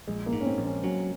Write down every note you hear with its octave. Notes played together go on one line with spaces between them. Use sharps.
A#1 G#3
A#3
G#2
C#4
C4
A#1
C#4
F#3 C#4